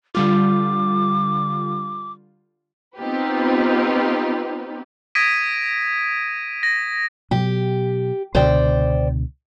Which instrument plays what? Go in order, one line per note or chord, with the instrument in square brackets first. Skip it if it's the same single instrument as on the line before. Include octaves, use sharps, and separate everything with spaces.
[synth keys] D3 G3 F4 [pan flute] D6
[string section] B3 C4 D#4 F4 G4 B4
[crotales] D#6 G#6 A#6 B6 D7 D#7
A#6
[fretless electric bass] B2 F#3 [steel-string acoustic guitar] G4
[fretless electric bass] C#2 B2 D3 [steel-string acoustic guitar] C5 D5 G5